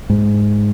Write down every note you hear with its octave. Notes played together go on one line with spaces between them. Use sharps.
G#2